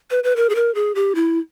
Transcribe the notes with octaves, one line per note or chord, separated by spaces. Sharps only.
B4
B4
A#4
G#4
A#4
G#4
G4
E4